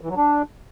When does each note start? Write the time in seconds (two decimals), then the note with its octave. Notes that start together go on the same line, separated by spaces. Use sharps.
0.01 E3
0.09 F#3
0.17 D4